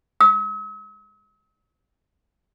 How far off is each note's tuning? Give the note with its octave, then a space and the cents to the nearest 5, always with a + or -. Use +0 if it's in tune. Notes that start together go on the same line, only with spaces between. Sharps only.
E6 -45